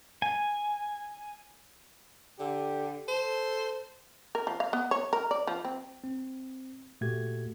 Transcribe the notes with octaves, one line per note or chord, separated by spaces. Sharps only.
G#5
D3 G4
A4 C5
A#4
F3
F5
B3
C#5
A#4
D5
F3
C4
C4
A#2 A3 F#4 G4 G#6